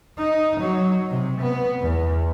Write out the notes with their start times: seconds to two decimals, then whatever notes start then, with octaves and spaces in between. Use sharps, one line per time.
0.18 D#4
0.60 F#3
1.10 C3
1.41 B3
1.81 E2